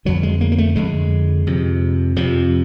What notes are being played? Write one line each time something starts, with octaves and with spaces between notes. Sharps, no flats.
F2 D3 F#3
G#3
A#3
A#3
A3
F2 D3 G#3
F2 C3
F2 C3 F3